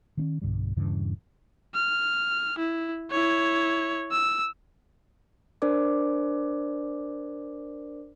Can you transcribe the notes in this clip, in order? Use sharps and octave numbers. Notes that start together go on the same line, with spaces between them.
D#3 C4 C#4
B1 G2 D3 G3
D#1 G2 C#3 E3
F6
E4
E4 C#5
E6
D4 A#4 C5 D5 D6